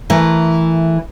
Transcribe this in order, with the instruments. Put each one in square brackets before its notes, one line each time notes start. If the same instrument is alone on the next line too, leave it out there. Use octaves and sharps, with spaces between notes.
[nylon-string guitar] E3 A3 A#4